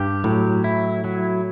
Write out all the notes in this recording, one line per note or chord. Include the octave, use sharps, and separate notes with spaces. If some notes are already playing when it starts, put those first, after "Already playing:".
Already playing: G2 G4
A2 F#3
E4
F#3